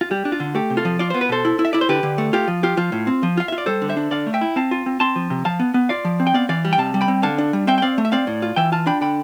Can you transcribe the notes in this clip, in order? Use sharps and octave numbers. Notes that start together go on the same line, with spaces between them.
F4
G3 G4
D4
F4
D3
A3 G4
C3
F4 A4
F3
F4 D5
B3 C5
B4
B2 A4 C5
E4
E4
E5
E4 D5
C5
D3 G4 B4
D3
A3
F4 G4
F3
F4 G4
F3 F4
A2
C4
F3
F4 F5
E5
F4
D5
G3 A4 C5
D3
C5 E5
D4
D3 D5 F5
A3
E5 G5
E4
C4 F5 A5
F4
C4
C4 A5 C6
F3
C3
F3 F5 A5
B3
B3
F4 D5 F5
F3
C4
G5
B3 D5 F5
E3 D5 F5
G3
G5
C3 F5 A5
G3
G5 B5
C4
D3 F5 A5
D4
G3
C4 E5 G5
G5
C4 D5 F5
A3
E5
C4 D5 F5
A2
F4
E3 E5 G5
F4 F5 A5
D4 G5 B5
D3 G5 B5